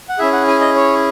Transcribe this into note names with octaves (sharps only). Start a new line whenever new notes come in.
F#5
C#4 E4 G#4 E5
F#5
G#5
D#5
C#5